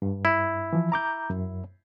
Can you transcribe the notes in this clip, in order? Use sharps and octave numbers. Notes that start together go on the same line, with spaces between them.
G2
E4
E3 F3
A#5 D6 G6
F#2